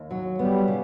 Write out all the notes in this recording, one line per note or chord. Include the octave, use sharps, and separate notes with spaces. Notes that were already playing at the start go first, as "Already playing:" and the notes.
Already playing: D#2
F#3
G3 B3
C#3